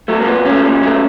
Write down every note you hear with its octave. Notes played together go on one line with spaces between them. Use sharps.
F#3 A3
A#3
A#2 B3
F#3 A3 C#4
A#2
F#3 A3